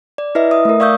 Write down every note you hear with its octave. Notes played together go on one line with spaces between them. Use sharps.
D5
E4 B4 D#5 E5
E5 D#6
A3 A#4
D5 F5 C#6 D#6 E6 G6